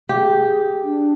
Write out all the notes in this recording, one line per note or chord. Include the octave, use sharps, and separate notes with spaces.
G4 G#4
D4